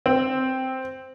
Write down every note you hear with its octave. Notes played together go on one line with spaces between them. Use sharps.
C4